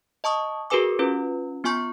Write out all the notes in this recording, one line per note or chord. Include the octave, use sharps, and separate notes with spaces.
D#5 A5 C#6 D#6
F#4 G#4 A#4 B4 G#5 D6
C#4 F4 B4
B3 F4 G#5 C#6 G6